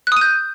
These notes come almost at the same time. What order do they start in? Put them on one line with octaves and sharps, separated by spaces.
F#6 D#6 D#7 G6